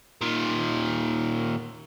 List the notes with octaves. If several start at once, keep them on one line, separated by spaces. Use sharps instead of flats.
A#2 D#3